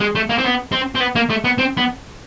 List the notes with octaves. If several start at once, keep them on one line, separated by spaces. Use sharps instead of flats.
G#3
A3
A#3
C4
B3
C4
C4
B3
A#3
A3
B3
C4
B3